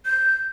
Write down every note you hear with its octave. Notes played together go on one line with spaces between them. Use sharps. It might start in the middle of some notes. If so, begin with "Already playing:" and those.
G6